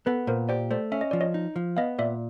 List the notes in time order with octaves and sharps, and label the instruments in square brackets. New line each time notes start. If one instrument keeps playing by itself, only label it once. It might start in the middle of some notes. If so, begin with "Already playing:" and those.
[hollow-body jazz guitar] B3 [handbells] A4 B4
[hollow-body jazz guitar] A#2 [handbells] A#4 C5
[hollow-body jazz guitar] G4 [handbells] C5 D5
[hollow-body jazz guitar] A3 [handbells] C5 D5
[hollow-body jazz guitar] C#4 [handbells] E5
[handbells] D#5
[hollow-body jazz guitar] F3 [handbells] D5
[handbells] C#5 D#5
[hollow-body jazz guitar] D#4
F3
[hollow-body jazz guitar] B3 [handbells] D#5 F5
[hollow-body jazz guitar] A#2 [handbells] D5 E5